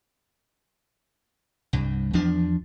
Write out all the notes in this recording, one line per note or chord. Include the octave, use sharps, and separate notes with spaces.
C2 G2
E2 F3 D4